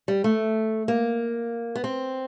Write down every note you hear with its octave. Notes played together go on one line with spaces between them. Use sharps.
G3
A3
A#3
B3
C4